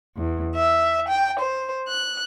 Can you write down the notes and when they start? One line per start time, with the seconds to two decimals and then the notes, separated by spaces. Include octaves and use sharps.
0.15 E2
0.56 E5
1.08 G5
1.38 C5
1.87 F#6